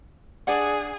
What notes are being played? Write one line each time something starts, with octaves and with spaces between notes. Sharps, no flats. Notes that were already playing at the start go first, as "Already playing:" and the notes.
D4 G#4 D5 F#5